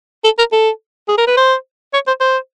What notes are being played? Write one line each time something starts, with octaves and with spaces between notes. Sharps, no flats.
A4
A#4
A4
G#4
A#4
B4
C5
C#5
C5
C5